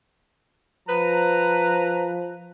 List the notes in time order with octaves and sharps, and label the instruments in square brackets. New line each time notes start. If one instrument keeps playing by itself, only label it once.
[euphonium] F3 [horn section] B4 A#5